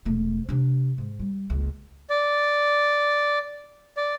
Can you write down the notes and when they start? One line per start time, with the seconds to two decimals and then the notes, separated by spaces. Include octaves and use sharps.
0.05 E1 A3
0.49 C3 D4
0.98 G#2
1.19 G3
1.50 F#1 C#2
2.10 D5
3.97 D5